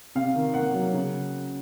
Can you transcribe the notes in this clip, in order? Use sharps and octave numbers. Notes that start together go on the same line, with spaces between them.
C3 F5
D#3
A#3 F#5
F#3
C#3